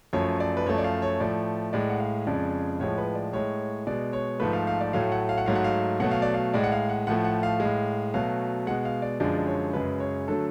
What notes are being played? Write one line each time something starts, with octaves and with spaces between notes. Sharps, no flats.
F#2 F3 A3 C#5
D5
B4
F#2 F3 A3 C#5
D5
F5
C#5
A2 F3 A3 D5
A2 G#3 D5
F#5
F5
F2 C#3 G#3 D5
A2 F3 G#3 C#5
B4
D5
A2 G#3 C#5
B2 G#3 D5
C#5
G#2 F3 A3 B4
F5
F5
D5
A2 F#3 A3 F5
F#5
F5
F#5
G#2 F#3 A3 F5
F#5
F5
B2 F#3 A3 F#5
F5
D5
F5
A2 G#3 D5
F#5
F5
F#5
A2 F3 A3 F#5
F#5
F5
G#3
A2
B2 F#3 A3 F5
B2 G#3 F#5
F5
D5
F#2 D3 F3 G#3 D5
D5
C#5
F#2 C#3 G#3 B4
C#5
D3 F#3 A3 A4